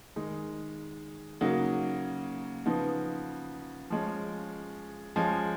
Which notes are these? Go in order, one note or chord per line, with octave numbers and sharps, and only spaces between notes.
D#3 G#3 D#4
C#3 F#3 A#3 D#4
C#3 F3 B3 D#4
F3 G#3 C#4
F3 G#3 C#4